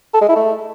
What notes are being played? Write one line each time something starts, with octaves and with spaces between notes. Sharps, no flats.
A4
G#3
E4
A3